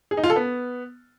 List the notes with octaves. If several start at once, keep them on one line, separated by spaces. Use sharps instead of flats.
G#4
D#4
F4
A4
B3